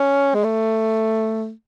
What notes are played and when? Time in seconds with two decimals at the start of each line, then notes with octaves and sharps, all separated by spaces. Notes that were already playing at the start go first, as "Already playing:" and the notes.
Already playing: C#4
0.35 G#3
0.44 A3